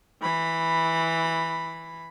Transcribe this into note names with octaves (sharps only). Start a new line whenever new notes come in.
E3 B5